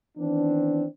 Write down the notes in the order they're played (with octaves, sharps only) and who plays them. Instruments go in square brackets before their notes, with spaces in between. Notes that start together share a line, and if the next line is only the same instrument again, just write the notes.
[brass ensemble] D#3 E3 B3 C4 D4